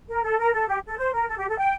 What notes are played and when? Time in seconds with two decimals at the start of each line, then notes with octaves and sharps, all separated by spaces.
0.09 A#4
0.23 A4
0.39 A#4
0.53 A4
0.68 G4
0.88 A4
0.98 C5
1.13 A#4
1.28 A4
1.37 G4
1.48 A4
1.58 G5